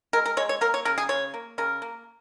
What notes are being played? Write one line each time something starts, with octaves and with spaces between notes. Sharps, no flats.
G#3 A#4
A#4
G#3 C#5
C#5
A#3 A#4
C#5
C#3 A#4
G#4
C#3 C#5
A#3
C#3 A#4
A#3